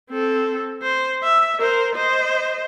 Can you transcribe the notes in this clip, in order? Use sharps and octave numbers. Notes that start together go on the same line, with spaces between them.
C4 A4
C5
E5
A#4 C5
C5 D#5